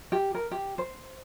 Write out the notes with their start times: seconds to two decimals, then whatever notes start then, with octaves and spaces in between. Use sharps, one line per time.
0.12 G4
0.35 A#4
0.52 G4
0.78 C5